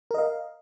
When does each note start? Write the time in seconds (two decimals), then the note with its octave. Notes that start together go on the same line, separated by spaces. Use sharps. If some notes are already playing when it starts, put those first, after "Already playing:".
0.11 A#4
0.14 D#5
0.18 F5